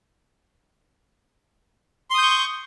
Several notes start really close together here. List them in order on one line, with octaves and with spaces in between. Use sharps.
C6 D#6 G6 C#6